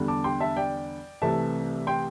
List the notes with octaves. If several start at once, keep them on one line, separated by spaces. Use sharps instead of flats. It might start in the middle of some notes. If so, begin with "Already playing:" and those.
Already playing: E2 D3 G3
A5 D6
G5 C6
E5 A5
D5 G5
C2 C3 E3 A3 E5 A5
G5 C6